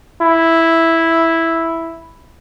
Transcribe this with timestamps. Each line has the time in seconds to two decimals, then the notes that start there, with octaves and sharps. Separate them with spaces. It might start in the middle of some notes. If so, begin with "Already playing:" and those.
0.22 E4